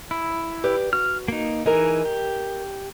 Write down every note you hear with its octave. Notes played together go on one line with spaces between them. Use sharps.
E4
G4 B4 D5
F#4 F6
A#3 D#4
E3 D#4 G#4 A#4 D#5
G4